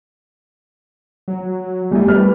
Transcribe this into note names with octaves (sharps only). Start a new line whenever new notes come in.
F#3
E2 E3 G3 A3
B4 F6